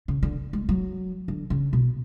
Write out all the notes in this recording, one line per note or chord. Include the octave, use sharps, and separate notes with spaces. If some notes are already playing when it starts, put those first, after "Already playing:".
C#3
D3
G#3
F#3
D3
C#3
B2